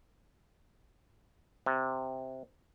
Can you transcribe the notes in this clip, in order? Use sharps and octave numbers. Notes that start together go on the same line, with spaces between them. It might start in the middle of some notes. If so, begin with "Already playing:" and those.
C3